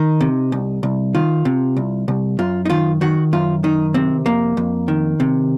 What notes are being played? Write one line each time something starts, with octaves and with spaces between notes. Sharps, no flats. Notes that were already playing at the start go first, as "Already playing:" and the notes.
Already playing: D#3 D#4
C3
C2
C2
D#3 F4
C3
C2
C2
F#2 F4
D#4
D#3 F4
D#3 F#4
F#2 F4
D#3 D#4
C3 C4
F2 A#3
F2
D#3
C3